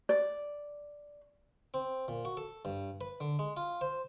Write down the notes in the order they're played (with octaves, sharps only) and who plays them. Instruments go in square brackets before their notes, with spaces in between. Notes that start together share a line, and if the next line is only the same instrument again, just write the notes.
[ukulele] D5
[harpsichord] C4
A#2
F#4
A4
G2
B4
D3
G#3
F4
C5